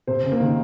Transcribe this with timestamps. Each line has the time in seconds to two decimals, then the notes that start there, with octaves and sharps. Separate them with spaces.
0.07 C3 C5
0.24 C#3
0.32 A#3
0.40 D#3